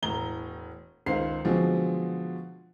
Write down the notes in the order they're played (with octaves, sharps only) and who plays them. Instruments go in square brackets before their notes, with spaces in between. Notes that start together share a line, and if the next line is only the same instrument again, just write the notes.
[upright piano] E1 A2 A#5 G7
C#2 D#3 C5 F5 C7
B2 D3 F3 F#3 G#3 C4